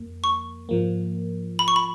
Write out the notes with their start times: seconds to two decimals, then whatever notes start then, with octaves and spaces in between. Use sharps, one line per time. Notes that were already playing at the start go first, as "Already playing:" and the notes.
Already playing: F2 A#3
0.24 C#6
0.69 G#2 F3 A#3
1.59 B5
1.68 C#6
1.76 B5